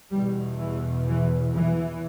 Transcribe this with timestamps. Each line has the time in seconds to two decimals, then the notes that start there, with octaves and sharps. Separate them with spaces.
0.13 E2 B2 G3
0.60 E3
1.07 E3
1.55 E3